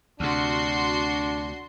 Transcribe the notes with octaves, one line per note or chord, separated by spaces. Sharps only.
D2 C3 D4 F#4 C6